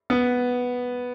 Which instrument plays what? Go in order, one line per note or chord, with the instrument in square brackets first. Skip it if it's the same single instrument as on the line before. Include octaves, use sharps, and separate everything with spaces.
[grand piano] B3